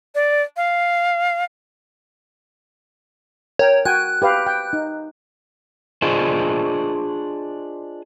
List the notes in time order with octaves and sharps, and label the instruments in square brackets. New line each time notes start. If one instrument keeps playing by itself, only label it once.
[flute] D5
F5
[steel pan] A#4 G5 [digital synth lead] C#5
[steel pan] F#4 G5 G#5 [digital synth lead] F#6
[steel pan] G4 B4 F5
G5
D#4
[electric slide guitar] D4 F4 G#4 C5 D#5